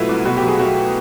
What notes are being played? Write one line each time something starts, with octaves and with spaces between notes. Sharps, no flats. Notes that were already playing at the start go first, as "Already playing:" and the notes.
Already playing: B2 F#3 A3 E4 F4 B4
C2
B2 F#4
F#3 G4
G#4
A3 F#4